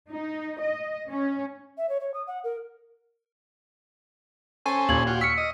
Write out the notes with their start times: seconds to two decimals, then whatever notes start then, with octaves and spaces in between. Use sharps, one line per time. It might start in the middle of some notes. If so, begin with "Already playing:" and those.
0.11 D#4
0.61 D#5
1.11 C#4
1.78 E5
1.89 C#5
2.00 C#5
2.14 D#6
2.27 F#5
2.44 A#4
4.66 C#4 A4 C5 G#5
4.89 D#2 A#2 G#6 F#7
5.07 F4 F#4 G5
5.21 C#6 E6 F6 B6 C#7
5.38 D#5